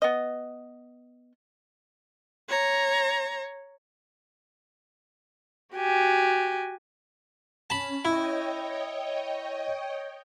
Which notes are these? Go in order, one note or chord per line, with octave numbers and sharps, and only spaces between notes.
B3 D#5
C#5 A#5
F#4 G4 G#5
C#4 A5 B5
E4 C#5 D#5 G5